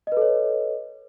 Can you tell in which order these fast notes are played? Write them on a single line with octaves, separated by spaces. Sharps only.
D#5 B4 A4 C#5